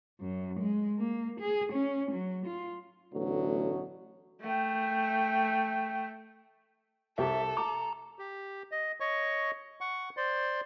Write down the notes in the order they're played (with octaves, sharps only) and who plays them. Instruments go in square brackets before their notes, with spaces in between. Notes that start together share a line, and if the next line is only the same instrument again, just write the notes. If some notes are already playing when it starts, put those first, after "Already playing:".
[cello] F#2
G#3
A#3
G#4
C#4
F#3
F4
[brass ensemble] A1 D2 B2 F#3
[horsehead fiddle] A3 G5
[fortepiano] C2 G4 [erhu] A4 [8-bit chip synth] E5
[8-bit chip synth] A#5 [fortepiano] D6
[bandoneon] G4
D#5
C#5 D#5 C#6
F#5 C#6
C5 D5 C6